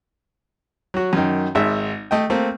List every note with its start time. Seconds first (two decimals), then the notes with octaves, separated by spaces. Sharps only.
0.94 F#3 F#4
1.13 F#2 D#3
1.55 G#1 G#2 G#3 E5
2.11 A3 D#5 G5
2.30 A3 A#3 C4